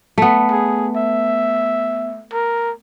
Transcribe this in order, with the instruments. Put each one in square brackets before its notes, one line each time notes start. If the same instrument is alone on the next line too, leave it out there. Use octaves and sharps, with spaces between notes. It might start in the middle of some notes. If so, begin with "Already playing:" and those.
[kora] A3 B3
[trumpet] G#4
E5
A#4